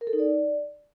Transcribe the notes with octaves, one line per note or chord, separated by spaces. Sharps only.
A#4
A4
D#4
D5